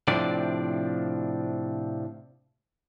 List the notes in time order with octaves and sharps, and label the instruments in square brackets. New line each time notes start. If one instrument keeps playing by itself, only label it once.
[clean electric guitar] A2 C3 F3 C4 D4 D5